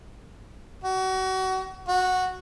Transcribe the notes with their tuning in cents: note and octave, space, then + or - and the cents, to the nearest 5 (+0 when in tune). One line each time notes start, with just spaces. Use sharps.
F#4 +30
F#4 -10